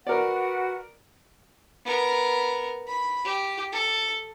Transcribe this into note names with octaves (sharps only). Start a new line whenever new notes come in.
F#4 A#4 B4 D5 F#5
B3 A#4
B5
G4
A4